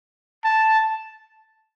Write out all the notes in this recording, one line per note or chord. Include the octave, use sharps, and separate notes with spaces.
A5